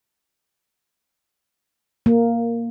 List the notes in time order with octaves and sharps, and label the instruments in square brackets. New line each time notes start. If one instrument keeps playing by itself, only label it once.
[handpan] A#3